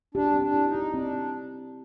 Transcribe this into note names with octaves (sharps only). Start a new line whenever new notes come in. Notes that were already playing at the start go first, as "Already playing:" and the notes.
D4 G4
C4
D4
E4
D#4
G4
C4 D4